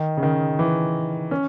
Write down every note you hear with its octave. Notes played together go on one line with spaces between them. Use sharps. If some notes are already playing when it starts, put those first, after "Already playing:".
Already playing: D#3
C#3
D#3
E3
C#4